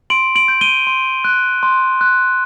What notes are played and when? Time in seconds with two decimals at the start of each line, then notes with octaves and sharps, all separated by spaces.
0.10 C6 D7 F#7
0.35 D7 F#7
0.48 G6
0.61 D#7 G7
0.87 C6
1.24 F#6
1.63 C6
2.01 F#6